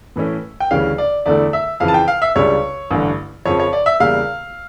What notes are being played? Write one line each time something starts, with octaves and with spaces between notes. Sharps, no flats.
A2 E3 A3 C#4 E4
G5
D2 C#3 E3 G3 C#4 F5
D5
E2 D3 A3 E4 D5
E5
F2 C#3 E3 F5
A5
G5
F5
E5
C#2 C#3 G3 D4 C#5
A1 G2 D3
F2 C#3 F3 C#5
C#5
D5
E5
E2 C#3 G3 A#3 F5